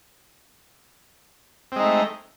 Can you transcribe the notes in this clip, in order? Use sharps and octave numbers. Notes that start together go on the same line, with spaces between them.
G#3 A3 C4 D#4